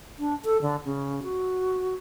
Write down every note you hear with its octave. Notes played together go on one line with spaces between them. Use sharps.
D4
A4
D3
C#3
F#4